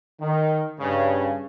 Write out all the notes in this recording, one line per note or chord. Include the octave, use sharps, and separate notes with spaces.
D#3
G2 C#3